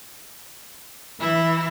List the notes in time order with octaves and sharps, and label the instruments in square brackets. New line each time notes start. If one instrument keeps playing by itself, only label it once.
[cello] E3 [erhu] E4